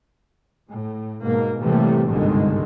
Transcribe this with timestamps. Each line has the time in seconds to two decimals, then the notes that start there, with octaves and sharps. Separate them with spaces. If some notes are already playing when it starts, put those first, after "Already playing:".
0.67 A2
1.22 G#2 B2 A#3
1.60 A2 C3 E3 G3 A3 A#3
2.07 G1 C2 G#2 D3 D#3 G#3